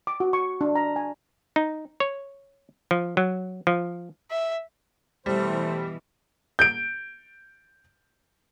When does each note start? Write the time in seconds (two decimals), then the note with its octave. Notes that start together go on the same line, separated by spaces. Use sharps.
0.07 D6
0.20 F#4
0.33 C#6
0.61 D4
0.75 A#5
0.96 G#5
1.56 D#4
2.00 C#5
2.91 F3
3.17 F#3
3.67 F3
4.31 E5
5.26 B2 E3 G3 A3 E4 C5
6.59 G6 D7